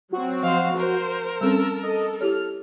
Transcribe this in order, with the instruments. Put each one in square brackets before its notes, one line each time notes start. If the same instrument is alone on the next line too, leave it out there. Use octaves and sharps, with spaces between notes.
[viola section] F#3 C4 [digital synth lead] F#4
[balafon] F3 [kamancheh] C5 F5
[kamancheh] A#4 [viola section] C5
[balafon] G3 C4 C#4 [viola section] A4 [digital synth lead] E6
[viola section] A4 [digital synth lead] D#5
[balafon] E4 G4 C#5 [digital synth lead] F6